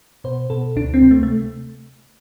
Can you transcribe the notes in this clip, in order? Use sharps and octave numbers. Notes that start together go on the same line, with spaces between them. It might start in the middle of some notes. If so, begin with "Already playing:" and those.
B2 C5
B2 A4
D2 D4
C4
C3
A3
A3